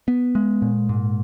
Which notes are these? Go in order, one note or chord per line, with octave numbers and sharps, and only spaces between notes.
B3
G#3
A#2
G#2